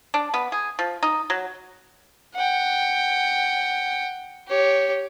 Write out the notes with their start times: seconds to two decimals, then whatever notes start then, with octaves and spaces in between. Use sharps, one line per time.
0.14 D4
0.34 B3
0.52 G#4
0.79 F3
1.03 D#4
1.30 F#3
2.34 F#5 G5
4.48 G4 C#5